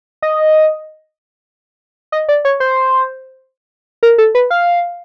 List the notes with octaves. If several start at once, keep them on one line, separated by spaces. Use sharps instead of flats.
D#5
D#5
D5
C#5
C5
A#4
A4
B4
F5